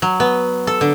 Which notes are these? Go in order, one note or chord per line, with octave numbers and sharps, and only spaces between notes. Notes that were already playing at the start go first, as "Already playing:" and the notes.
F#3
B3
A4
D3